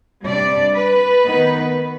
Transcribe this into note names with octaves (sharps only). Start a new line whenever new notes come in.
C3 G3 D4 D5
B4
D#3 B3 D#4